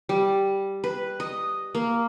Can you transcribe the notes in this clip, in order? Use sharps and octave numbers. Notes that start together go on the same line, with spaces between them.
G3
B4
D#5
A#3